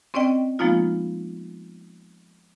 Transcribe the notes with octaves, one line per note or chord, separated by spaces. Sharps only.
C4 C#4 D5 D#5 G5
F3 G#3 A#3 B3 D#4 F4